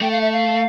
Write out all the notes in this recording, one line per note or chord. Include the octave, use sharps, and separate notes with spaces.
A3 G5
F5
E5
F5